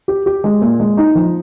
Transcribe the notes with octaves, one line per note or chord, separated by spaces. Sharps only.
G4
G4
G#3
A#2
G#3
D#4
F3